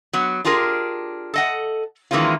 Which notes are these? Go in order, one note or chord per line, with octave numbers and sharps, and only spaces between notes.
F#3 B3
D4 F4 G4 G#4 A#4
A4 D#5 F#5
D#3 E3 G#3 A#3 C#4 F4